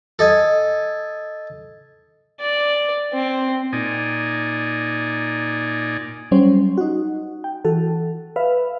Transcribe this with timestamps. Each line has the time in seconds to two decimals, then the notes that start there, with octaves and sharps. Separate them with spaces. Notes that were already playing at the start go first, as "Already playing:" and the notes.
0.19 A4 D#5 G#5
2.40 D5
3.13 C4
3.73 A#2 D#4 D5 G#5
6.31 F#3 G3 C#4 C5
6.77 D#4 F#4
7.44 G5
7.65 E3 F#4 A4
8.36 B4 E5 F5